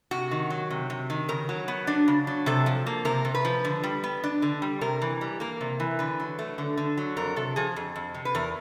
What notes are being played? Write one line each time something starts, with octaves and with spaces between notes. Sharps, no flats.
C3 F#4
D#3
F#3
C3
C3
D#3
C#3 A#4
F#3
B3
D4
C#3
F#3
C3 A4
F3
A#3
C3 A#4
C3
B4
F3
D3
G3
B3
D4
D3
G3
C3 A#4
E3
G3
A#3 A#4
C3
E3
D3 B4
F#3
A3
D3
D3
F#3
F2 A#4
C3 A4
F3 G#4
F2
F2
C3
B4
E2 A#4